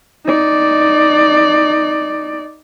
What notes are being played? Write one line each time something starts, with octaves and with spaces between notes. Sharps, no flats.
D#4 D5